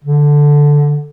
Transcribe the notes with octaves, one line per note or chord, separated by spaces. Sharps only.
D3